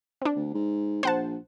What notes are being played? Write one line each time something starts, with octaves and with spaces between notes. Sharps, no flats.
C4 D4
D2
G#2
A#1 C5 F#5 A5